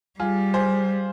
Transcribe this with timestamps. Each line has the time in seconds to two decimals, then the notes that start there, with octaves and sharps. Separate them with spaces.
0.20 G3 F4 G#4
0.54 G#4 C5